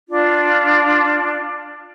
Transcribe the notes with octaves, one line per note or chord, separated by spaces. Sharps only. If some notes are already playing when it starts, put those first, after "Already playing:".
D4 F4